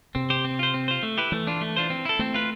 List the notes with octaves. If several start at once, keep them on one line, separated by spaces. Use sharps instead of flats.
C3 C4
G4 C5
C4
F4 C5
C4
F4 C5
A3
E4 G4 B4
E3 A3
D4 F4
A3
D4 F4 C5
C4
E4 A4
A3 C4
F4 B4